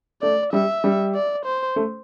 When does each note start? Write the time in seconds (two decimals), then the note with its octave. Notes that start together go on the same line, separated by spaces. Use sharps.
0.22 A3 D5
0.53 G3 E5
0.84 G3
1.14 D5
1.45 C5
1.76 A3